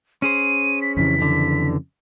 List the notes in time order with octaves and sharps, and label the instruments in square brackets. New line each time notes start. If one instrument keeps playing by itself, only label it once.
[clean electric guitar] C#4 G#4 C5 [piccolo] D#7
[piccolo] B6
[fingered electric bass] F2 C#3 E3 [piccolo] B6
[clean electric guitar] D3